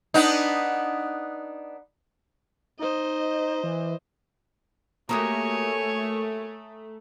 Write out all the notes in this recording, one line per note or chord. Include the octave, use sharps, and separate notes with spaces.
B3 D4 D#4
D#4 C5 D#5
E3
A3 A#3 F#4 G4 C#5 G#5 A#5 D#6